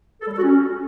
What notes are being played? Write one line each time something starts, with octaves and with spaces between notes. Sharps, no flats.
A4
G3
A4
F#4
C#4